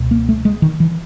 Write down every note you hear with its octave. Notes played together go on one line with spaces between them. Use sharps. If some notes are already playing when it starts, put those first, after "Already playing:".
Already playing: C#2 B2
A#3
A3
G#3
D#3
E3